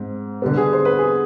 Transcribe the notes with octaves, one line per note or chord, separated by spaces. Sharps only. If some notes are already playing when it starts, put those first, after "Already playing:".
Already playing: G#2 C4
D3 G3 B3
G#4
C5
B4
G#4